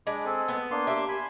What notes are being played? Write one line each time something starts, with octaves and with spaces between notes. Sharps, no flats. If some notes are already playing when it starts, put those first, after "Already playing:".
G#3 D4 B5 D6
C4 G#4 A4
B3
A#3 D4 C6
G4 E5
G#5 B5 C6